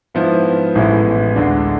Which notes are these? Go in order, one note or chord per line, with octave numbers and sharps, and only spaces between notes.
G#2 F3 B3 E4
A1 A2 G#3 B3 E4
D2 D3 G#3 D4